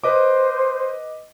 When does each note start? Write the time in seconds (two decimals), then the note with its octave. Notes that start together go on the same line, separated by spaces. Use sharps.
0.04 B4 C5 D#5 D6